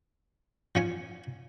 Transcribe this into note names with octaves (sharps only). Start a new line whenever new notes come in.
F3 C#4 G#5